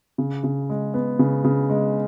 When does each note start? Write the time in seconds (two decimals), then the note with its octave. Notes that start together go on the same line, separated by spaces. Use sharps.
0.18 C#3
0.44 C#3
0.70 G#3
0.94 B3
1.19 C#3
1.44 C#3
1.70 G#3